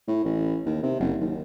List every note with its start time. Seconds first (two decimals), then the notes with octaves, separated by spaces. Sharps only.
0.07 A2
0.24 A1
0.66 D#2
0.83 C3
1.00 F#1
1.20 D#2